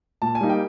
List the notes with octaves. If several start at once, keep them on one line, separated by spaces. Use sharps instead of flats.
A#2 A5
G#5
G3 A#3 D#4
G5